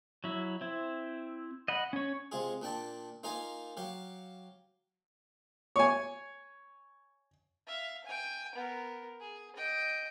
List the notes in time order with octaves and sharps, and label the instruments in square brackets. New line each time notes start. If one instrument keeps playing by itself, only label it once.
[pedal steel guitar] F#3 E4
C4 E4
D#5 F#5 B5
C#4 C#5
[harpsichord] C3 G#3 F4 G#4
A#2 D4 G5 A5
A#3 D#4 F4 A#4 F5 G#5
F#3 G4 F5
[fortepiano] C#5 G#5
[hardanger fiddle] E5 F5
G5 G#5
B3 A#4
G#4
D#5 G5